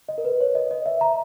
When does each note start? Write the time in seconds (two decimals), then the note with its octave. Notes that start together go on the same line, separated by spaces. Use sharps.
0.09 D#5
0.18 A#4
0.25 B4
0.41 C#5
0.55 D#5
0.71 D#5
0.86 E5
1.01 A#5